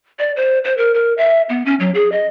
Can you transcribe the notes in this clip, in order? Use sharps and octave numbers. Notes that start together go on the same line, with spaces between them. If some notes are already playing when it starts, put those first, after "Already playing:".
D5
C5
C5
A#4
A#4
E5
B3
C#4
F#3
G#4
D#5